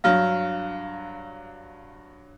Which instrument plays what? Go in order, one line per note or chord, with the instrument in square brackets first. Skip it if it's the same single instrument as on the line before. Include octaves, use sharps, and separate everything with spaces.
[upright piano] G2 F#3 [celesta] F5 F6